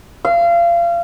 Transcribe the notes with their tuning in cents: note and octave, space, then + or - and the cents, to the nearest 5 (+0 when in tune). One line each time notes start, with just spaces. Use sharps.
F5 -30